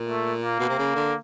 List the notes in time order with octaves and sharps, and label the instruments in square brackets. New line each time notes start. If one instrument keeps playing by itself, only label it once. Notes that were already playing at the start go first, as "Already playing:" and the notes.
Already playing: [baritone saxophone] A#2
[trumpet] A3
A#3
[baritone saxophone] B2
C3
C#3
D3